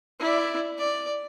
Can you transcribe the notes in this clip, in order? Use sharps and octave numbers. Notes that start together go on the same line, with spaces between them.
E4 D5
D5